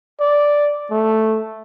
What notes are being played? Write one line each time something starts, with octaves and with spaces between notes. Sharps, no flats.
D5
A3